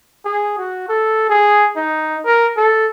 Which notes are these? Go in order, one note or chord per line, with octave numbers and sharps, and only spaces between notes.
G#4
F#4
A4
G#4
D#4
A#4
A4